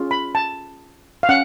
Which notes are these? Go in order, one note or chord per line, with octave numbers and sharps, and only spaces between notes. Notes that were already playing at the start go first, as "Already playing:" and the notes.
Already playing: C#4 F4 G#4 C#5
B5
A5
F5
C#4 F#5